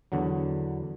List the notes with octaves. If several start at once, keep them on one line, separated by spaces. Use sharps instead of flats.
E2 D3 F#3